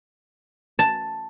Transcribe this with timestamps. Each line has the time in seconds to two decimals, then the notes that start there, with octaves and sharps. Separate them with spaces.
0.79 A5